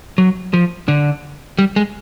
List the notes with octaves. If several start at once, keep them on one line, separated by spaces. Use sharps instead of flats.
F#3
F3
D3
G3
G#3